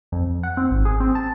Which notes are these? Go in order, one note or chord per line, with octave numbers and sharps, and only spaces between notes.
F2
F#5
C4
G#1
G#4
C4
A5